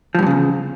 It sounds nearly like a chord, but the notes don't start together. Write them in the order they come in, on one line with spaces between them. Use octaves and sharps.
F3 G2 A#2 C#3 E2